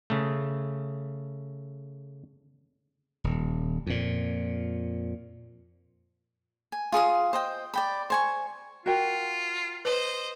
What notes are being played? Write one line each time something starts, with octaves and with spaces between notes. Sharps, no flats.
C#3 A3
D#1
F2 A#2
G#5
F4 G#4 C6 D#6
C5 D#5 G5
D5 G5 B5
C5 G#5 C#6
F4 F#4 A#4 G5
B4 C5 D#5